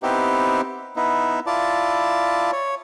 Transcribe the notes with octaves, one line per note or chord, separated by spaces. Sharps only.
B3 C4 D#4 E4 G4
B3 D#4 E4
E4 F4 D5 A5
C#5